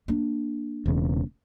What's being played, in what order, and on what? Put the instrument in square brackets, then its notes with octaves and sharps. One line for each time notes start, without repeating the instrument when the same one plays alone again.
[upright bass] A#3 D4
[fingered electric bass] E1 E2 C#3